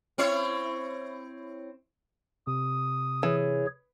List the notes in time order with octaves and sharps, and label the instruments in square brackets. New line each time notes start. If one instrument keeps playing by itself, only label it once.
[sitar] C4 E4 C#5
[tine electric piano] C3 [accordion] D#6
[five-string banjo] E3 [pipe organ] G#4 C#5